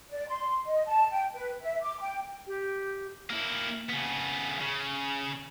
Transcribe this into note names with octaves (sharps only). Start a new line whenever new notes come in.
D5
C6
D#5
A5
G5
B4
E5
D6
G5
G4
A#3 E4
C#3 B3
C#3